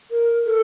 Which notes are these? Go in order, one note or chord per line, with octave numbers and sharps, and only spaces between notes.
A#4
A4